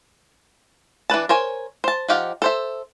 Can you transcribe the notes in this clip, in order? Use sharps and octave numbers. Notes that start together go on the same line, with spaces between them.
E3 D4 B4 A5
A#4 C5 C#5 G#5
C5 A5
F3 D#4 G4 F5 F#5
A4 C5 E5